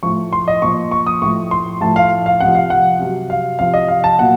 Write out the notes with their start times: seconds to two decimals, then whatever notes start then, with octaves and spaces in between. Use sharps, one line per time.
0.03 A2 F3 C#6
0.33 C6
0.48 D#5
0.62 A#2 F3 C#6
0.91 C#6
1.07 D#6
1.22 A2 F3 C#6
1.51 C6
1.81 A2 F3 A5
1.96 F5
2.26 F5
2.40 C3 F3 F#5
2.55 F5
2.70 F#5
2.99 C3 F#3
3.30 F5
3.59 C3 F3 F5
3.74 D#5
3.88 F5
4.04 A5
4.18 A#2 F#3 F#5